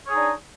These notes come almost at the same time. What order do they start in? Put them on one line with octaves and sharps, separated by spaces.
C#5 G#4 D#4 D4